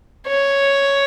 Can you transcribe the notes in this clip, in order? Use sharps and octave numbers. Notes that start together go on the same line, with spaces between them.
C#5